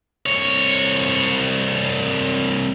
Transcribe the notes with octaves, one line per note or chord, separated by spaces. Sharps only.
C2 C#5